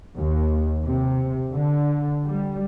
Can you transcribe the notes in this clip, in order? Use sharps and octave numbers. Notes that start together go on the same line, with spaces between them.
D#2
C3
D3
G3